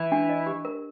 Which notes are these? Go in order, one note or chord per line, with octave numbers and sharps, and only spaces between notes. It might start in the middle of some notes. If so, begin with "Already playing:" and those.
Already playing: E3 E4
D4
D#5
G4
A#4